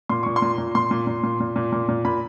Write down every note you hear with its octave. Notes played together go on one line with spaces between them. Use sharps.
A#2 C6
A#2 C#6
C6
A#2
A#2
A#2 C6
A#2
A#2
A#2
A#2
A#2
A#2
A#2
A#2 B5